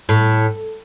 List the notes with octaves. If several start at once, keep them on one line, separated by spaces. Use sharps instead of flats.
A2